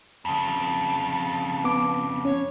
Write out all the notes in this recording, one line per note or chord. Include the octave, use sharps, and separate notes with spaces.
F2 C#3 A5
B3 D6
C#4 C#5